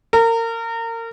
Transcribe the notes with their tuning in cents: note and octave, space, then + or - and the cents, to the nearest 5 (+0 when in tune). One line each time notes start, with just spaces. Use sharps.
A#4 -30